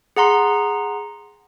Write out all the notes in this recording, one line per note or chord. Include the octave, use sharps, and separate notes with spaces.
G#4 F#5 A#5 C6